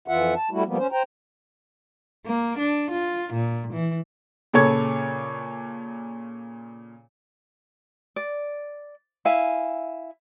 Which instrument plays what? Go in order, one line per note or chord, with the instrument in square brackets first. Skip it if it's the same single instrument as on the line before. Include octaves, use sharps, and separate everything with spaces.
[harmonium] F2 E3 F4 E5 F#5
A5
G3 A3 E4 F#4
F3 G3 A#3 B3
C#4 C5
C5 G5 A#5
[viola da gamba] A#3
D4
F4
A#2
E3
[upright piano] A#2 C#3 A4 C#5 G#6
[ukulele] D5
E4 E5 F5 G#5